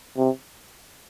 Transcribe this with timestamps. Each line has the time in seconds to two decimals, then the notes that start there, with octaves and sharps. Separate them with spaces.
0.17 C3